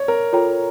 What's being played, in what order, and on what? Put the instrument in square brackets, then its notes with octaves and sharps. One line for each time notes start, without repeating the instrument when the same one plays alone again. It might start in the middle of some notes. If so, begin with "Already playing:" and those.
Already playing: [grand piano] C#5 D5
A#4
[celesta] F4 A4 C#5 G5 A#5